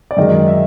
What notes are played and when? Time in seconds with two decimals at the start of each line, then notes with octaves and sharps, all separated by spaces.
0.11 D5
0.17 F#2 D#3 G#3 D#5
0.48 E5